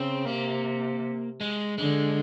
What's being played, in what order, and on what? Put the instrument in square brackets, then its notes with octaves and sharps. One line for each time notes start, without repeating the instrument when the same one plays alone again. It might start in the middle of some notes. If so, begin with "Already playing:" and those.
Already playing: [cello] C#3 [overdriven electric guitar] C4
[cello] C3 [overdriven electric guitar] A#3
[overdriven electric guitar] G#3
[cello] D3 [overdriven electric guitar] G#3